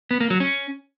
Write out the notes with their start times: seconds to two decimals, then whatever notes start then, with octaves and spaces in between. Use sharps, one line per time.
0.11 B3
0.21 A#3
0.30 F#3
0.40 C#4